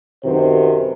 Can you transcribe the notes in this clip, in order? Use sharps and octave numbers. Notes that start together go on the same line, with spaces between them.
F#2 C3 D#3 F#4 B4 C5